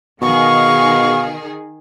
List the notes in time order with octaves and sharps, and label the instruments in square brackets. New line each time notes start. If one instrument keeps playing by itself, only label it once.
[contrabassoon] B2 [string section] D#3 G#4 [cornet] F5 [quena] C#6